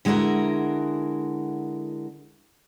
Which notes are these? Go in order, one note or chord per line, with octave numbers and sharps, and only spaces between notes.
D3 G#3 E4 F#4 A#4